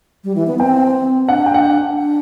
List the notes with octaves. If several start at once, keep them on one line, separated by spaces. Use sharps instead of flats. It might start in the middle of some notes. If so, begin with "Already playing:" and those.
G3
E3
B3
C4 G5
D4 F#5
G5
F#5
D4